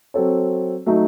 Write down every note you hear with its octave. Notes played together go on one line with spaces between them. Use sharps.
F#3 C4 F#4 A4 C#5
F#3 A3 D#4 F#4 A4